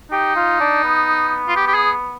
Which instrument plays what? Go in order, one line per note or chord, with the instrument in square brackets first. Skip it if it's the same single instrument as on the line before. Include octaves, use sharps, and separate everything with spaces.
[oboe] D#4 [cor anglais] G4
[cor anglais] F4
D4
B3
[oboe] F4
G4
G4
G#4